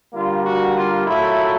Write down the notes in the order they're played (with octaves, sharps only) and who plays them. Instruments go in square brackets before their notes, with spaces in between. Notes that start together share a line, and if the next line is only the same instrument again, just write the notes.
[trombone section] D3 G3 A#3 F4
F#4
F4
A#2 F#3 A3 E4